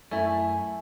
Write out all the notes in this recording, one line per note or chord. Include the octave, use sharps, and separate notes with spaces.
F#2 A3 E4 G#5